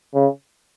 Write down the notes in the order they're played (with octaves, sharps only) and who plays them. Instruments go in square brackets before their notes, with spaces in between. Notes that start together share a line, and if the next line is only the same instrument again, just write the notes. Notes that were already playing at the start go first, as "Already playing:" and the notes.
[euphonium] C#3